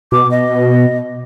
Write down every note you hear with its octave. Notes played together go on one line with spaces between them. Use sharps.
B2 D6
D#5